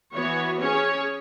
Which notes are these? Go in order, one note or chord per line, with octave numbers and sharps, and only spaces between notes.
E3 B3 F#4 C#5
C#4 G#4 C#5